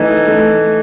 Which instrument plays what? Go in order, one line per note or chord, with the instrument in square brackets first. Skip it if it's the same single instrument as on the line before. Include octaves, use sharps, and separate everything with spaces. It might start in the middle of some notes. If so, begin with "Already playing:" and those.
Already playing: [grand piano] E3 [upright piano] A3 D#4
[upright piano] A3